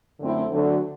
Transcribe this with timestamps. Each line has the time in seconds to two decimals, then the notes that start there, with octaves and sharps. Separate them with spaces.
0.18 F#2 D3 A3 C4 E4
0.50 D2 D3 F#3